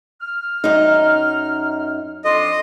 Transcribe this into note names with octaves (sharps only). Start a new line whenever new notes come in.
F6
F#2 D#4
F2 D4 D#5 C6